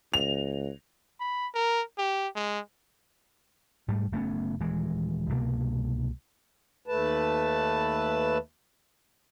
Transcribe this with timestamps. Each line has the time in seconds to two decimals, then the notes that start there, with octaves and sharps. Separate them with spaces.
0.14 C#2 F7
1.20 B5
1.54 A#4
1.98 G4
2.35 G#3
3.88 G#2 G3 A3
4.12 F#1 A3 B3 C#4
4.60 D#1 E3 G#3
5.29 C2 G2 B2 A#3
6.86 D#2 A3 B4 A5